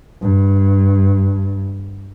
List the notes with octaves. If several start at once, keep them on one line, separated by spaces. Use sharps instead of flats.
G2